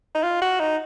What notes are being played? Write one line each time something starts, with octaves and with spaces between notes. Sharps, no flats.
D#4
F4
F#4
D#4